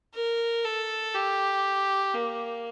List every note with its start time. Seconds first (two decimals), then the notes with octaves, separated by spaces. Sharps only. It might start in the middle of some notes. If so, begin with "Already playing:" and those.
0.15 A#4
0.65 A4
1.15 G4
2.14 A#3